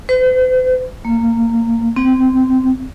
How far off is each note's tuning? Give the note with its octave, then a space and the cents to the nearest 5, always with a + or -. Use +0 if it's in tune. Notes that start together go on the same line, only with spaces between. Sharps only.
C5 -45
A#3 -20
C4 -15